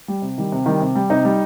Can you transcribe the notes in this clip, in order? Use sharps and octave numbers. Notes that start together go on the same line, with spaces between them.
G3
C3
D#3 G3
C3
D#3 G3
C3
G3
C3 D#4
G3